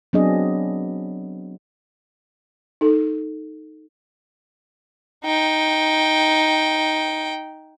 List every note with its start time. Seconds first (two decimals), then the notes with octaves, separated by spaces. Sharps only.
0.13 F#3 B3 C4 D4 G#4 D#5
2.81 D#4 A4
5.25 D#4 G5